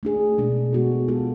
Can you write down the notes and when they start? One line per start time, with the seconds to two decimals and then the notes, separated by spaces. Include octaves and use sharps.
0.03 A3 D4 G#4
0.38 B2 G#3 D4
0.73 G#3 B3 F#4 A4
1.08 G#3 B3 F4 A4